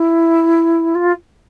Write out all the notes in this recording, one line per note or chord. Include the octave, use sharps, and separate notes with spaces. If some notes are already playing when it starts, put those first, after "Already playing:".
Already playing: E4
F4